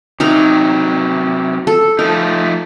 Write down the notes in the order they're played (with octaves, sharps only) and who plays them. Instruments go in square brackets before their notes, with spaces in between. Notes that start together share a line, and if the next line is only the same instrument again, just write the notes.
[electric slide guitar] C3 F#3 [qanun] D#4 A#4 A#5
[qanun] A4
[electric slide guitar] F3 A3 D#4 [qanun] A#4